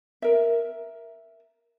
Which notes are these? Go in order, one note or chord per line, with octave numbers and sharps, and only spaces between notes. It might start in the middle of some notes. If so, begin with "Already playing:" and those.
A#4 E5